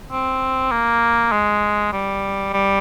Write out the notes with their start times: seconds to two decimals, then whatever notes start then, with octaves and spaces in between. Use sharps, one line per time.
0.11 C4
0.71 A#3
1.32 G#3
1.93 G3
2.53 G3